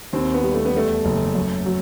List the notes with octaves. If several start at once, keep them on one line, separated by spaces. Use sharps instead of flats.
D#2 C4
B3
G3
A3
B3
E2 A3
F#1
F#2
F#3